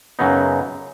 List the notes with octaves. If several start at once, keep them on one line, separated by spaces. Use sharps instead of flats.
F#2 C#3 F#3 B3 D#4